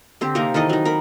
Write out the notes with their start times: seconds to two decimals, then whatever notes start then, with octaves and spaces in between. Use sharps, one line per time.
0.21 D3 C4 G4
0.35 C3 A#3 D#4 A#4
0.54 D#3 E3 A4 D#5
0.69 F#3 D#4
0.85 A#4 B5